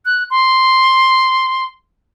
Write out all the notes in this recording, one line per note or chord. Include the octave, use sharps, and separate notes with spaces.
F#6
C6